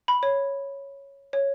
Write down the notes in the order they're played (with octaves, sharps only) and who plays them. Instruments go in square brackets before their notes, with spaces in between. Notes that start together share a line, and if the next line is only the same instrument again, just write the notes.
[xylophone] B5
C#5
C#5